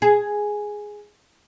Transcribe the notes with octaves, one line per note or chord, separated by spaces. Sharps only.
G#4